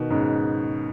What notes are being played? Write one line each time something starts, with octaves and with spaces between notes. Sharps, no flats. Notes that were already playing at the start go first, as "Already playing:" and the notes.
Already playing: B2 D#3
G#2 C#3